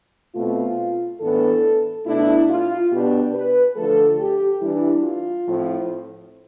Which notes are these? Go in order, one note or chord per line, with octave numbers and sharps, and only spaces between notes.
B2 A3 C4 F4
A2 E3 B3 D4 A4
B2 A3 D4 E4
F4
B2 B3 D4 G4
B4
D3 F3 A3 A4
G4
E3 G3 D4 E4
F4
A2 F3 C4